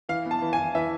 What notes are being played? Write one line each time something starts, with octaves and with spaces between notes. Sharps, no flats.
E3 F5
B3
A5
E3
G#5
E3
E3 E5